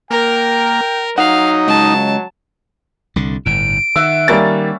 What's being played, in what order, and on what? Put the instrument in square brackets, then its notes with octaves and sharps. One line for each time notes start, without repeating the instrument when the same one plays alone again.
[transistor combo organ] A#3 [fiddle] A#4 [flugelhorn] G5
[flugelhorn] F#3 [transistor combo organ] D#4 [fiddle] F5 [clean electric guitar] F#5
[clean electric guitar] C#2 [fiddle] A5
[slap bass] C2 D3
[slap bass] G1 A2 [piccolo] D7
[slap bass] D#3 [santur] E5 F#5 [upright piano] E6
[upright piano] G3 A#3 A6 [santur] C#4